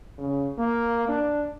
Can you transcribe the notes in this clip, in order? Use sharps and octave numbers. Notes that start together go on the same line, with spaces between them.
C#3
A#3
D4